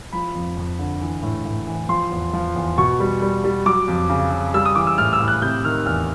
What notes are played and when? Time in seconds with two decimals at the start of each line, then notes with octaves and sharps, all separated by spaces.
0.13 F3 B5
0.35 F2
0.57 F2
0.79 D3
1.01 E3
1.23 A2
1.45 A2
1.67 E3
1.89 F3 C6
2.11 E2
2.33 F3
2.55 E2
2.78 B2 C#6
3.00 G3
3.22 G3
3.44 G3
3.66 F#3 D6
3.88 F2
4.09 C#3
4.32 C#3
4.54 G3 E6
4.65 D#6
4.75 E3 D6
4.87 E6
4.98 A2 F6
5.13 E6
5.20 A2
5.28 F#6
5.42 C3 G6
5.64 D#3 F6
5.86 E2 F6